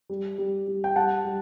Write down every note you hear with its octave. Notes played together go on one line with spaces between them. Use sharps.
G3
G3
G3
G5
G3 F#5 A5
G3